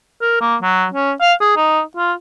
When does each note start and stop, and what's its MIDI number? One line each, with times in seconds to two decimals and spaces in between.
0.21 0.40 70
0.41 0.55 58
0.62 0.86 54
0.94 1.12 61
1.21 1.33 77
1.41 1.56 68
1.57 1.81 63
1.97 2.13 65